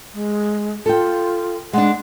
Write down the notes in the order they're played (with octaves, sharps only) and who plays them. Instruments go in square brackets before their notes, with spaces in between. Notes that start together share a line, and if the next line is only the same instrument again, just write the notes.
[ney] G#3
[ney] F4 [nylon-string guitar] A4 G5
[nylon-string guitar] G#3 D4 [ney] F#5